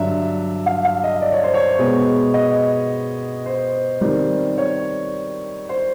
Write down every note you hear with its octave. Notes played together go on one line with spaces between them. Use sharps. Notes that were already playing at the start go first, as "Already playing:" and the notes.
Already playing: G2 D3 F#3 E5
F5
F5
D#5
D5
C#5
C5
C#5
B2 G#3 B3
D#5
C5
D#3 G3 C4
C#5
C5